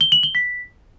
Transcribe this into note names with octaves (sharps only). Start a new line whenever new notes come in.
G7
F#7
G7
B6